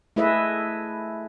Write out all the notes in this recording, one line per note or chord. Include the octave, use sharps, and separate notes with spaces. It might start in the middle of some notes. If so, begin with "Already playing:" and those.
A3 E4 G#4 B4 D#5 E5